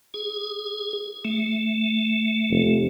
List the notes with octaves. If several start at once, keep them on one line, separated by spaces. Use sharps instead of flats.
G#4
A3
F1